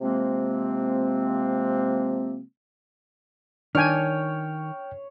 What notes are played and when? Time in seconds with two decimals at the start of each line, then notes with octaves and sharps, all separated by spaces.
0.02 C3 F3 G#3 A#3 C4
3.75 D#3 D4 C#5 G5 G#5 F6